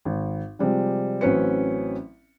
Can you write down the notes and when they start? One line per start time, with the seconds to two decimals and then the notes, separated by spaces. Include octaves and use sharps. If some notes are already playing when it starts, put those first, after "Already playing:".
0.05 G#1
0.59 C3 F3 G3 G#3
1.21 A1 F#3 C4 C#4 B4 C#7